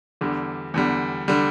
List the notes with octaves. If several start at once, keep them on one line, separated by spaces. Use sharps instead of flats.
E2 D3 G3
E2 D3 G3
D3 G3